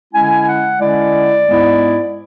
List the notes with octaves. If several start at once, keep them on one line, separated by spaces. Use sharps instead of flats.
D3 G#3 C#4 E4 G#5
F#5
D3 G#3 C#4 E4 D5
G#2 G#3 B3 E4